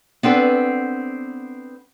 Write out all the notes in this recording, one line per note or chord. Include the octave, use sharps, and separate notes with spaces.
B3 C4 D4 A4 B4